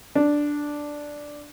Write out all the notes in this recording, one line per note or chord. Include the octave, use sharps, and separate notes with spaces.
D4